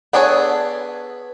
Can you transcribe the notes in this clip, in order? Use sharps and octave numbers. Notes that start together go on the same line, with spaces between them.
B3 D4 G#4 A4 C#5